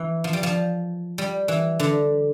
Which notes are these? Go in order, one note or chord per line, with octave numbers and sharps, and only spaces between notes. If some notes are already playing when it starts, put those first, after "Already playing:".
Already playing: E3
F3
G3
F3
G3
E3
D3